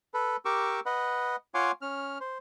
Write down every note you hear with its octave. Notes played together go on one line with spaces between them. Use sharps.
A4 B4
G4 A#4 C#6 D6 E6
B4 D#5 F#5
F4 C#5 F#5 G#5 C6 D6
C#4 F6
C5